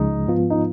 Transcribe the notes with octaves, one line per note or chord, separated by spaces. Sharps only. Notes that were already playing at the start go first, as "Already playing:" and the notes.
Already playing: C#2 C#3 F3 G#3 D#4
G#2 F3 B3 F4
D#4